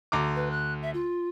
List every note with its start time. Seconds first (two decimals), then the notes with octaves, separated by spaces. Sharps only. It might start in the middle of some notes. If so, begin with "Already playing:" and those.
0.12 D2 A#5 D6
0.36 B4
0.51 F#6
0.82 E5
0.94 F4